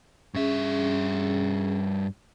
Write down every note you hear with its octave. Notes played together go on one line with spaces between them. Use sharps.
G2 C#4 G#4 E5